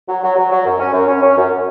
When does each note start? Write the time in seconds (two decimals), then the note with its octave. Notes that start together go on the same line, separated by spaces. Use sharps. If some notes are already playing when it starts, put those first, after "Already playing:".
0.08 F#3
0.22 F#3
0.36 F#3
0.51 F#3
0.65 F#2
0.80 C#4
0.93 F#2
1.07 C#4
1.22 C#4
1.36 F#2